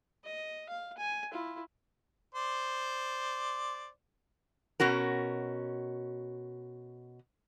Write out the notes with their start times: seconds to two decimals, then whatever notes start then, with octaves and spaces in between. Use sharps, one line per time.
0.24 D#5
0.69 F5
0.98 G#5
1.32 E4 F4
2.34 C5 D5
4.80 B2 C#4 F#4 A#4